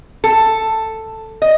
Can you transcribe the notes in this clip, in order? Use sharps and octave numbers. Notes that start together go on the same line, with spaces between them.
A4
D#5